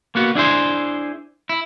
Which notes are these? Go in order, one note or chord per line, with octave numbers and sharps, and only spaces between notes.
A#3 B3 F#4
D4 E4 G#4 C5
E4